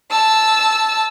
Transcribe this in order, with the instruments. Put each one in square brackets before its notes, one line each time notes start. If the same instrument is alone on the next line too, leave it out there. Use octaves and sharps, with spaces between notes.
[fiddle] A5 E6